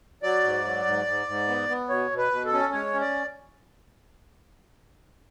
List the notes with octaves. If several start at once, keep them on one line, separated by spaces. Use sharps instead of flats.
F#3 D5
G#2
F#3
G#2
G#2
G#2
B3
B3
B2 C#5
B2
B4
B2
A4
C#4
G#3 C#5
C#4
D5